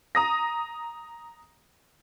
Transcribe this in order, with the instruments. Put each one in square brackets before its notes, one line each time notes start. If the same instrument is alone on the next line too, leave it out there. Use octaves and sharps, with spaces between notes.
[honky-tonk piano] A#5 D#6 A#6